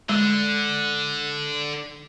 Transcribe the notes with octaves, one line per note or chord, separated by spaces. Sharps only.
D3 G#3